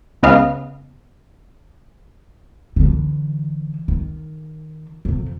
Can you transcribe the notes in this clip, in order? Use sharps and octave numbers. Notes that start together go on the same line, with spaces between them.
C#2 C#3 B3 D#5 F5
D3 E3
D#3
F2 C3